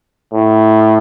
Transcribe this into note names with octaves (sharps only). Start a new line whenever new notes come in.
A2